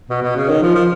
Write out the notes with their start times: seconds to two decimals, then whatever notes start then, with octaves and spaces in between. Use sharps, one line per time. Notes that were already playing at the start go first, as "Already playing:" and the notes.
0.10 B2
0.23 B2
0.36 C#3
0.49 D#3
0.62 F3
0.75 F3